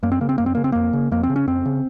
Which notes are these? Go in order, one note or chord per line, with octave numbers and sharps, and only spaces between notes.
F#2 A#3
C4
C#3 A#3
C4
F#2 A#3
C4
C#3 A#3
C4
F2 A#3
C#3
F2 A#3
C4
C#3
C#4
F2 C4
C#3